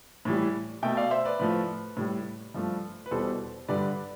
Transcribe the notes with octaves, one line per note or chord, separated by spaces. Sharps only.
A2 E3 G3
B2 A3 E5 G5
D5 F5
C5 E5
B4 D5
A2 F3 A3 B4
A2 G3
G2 F3 A3
B4
E2 B2 G3 A4 C5
G2 D3 G3 B4 D5